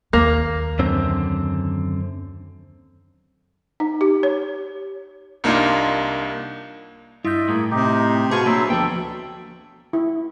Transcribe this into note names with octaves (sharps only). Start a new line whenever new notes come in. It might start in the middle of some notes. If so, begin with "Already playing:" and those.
D#2 A#3
F#2 D3 C4
D#4
G4
C#5
C2 A#3 D4 D#4 F4 F5
G2 E4 F4 D#5 E5 G6
A2 A#3 G#4
C3 D#4 G4
B2 F4 G#4 G#5 A5 C6 C#6
F#3 A#3 D4 C5 E5
D2 F3 A4 G5
E4